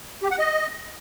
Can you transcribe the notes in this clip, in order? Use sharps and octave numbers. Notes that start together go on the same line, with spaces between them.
G4
F#5
D#5